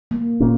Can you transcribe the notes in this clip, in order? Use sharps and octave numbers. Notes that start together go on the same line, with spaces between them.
A#3
A#2 A#3 C#4